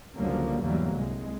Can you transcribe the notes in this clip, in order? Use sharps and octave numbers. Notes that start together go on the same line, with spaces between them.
C#2 F#2 D3 F3 G3 A#3
E2 G#2 D3 F#3 G3 A#3
C2 G#3